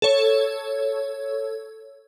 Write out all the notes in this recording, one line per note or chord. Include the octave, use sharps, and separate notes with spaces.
A4 C#5